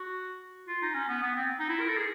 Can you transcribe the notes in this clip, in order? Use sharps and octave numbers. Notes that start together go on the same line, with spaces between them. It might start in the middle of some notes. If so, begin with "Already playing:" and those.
Already playing: F#4
F4
D#4
C#4
B3
B3
C4
D#4
E4
A#4
A4
G#4